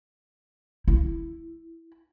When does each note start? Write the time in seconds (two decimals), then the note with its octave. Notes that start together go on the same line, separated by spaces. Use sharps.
0.88 E4